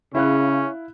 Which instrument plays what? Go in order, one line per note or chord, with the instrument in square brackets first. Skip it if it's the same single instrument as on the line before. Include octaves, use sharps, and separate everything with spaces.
[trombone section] C#3 [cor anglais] C#4 [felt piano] E4 F5 F#6